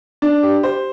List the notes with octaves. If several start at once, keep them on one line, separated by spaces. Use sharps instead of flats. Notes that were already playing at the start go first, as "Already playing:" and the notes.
D4
G4
C5